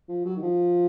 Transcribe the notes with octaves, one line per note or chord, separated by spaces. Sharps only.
F3
F#3
D#3
F3